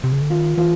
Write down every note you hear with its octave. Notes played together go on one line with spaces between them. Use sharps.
C3
C#3
D3
D#3 F4
E3 F4